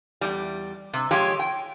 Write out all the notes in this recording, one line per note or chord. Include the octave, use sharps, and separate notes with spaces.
E2 G3
C3
F3 G#3 G4 C#5
G5